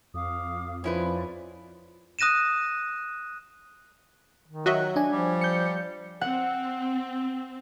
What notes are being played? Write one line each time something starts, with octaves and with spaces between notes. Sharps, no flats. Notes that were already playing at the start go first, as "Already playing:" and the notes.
F2 F5 D6 D#6
F3 C#4 E4 B4 C5 D5
D#6 F#6 A#6 D#7 E7
D#3
F#3 F#4 D#5 E5 F#6
D4 G#5
F3 G3
G6 C#7
C4 F#5